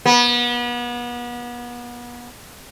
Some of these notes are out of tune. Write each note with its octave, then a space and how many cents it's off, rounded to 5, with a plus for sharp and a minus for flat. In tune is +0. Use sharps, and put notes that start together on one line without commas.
B3 -35